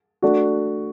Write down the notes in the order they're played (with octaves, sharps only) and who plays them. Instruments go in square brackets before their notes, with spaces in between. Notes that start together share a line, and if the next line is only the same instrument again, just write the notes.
[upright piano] A3 D4 F#4